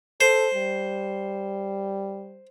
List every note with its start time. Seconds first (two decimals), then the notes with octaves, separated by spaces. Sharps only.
0.21 A4 C5
0.54 G3